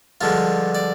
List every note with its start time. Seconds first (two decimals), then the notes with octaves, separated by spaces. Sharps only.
0.21 G2 D3 F3 G#3 F4
0.75 D5